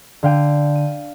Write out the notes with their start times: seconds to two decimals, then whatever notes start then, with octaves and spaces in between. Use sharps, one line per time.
0.23 D3 F5 G5 D#7
0.75 D#7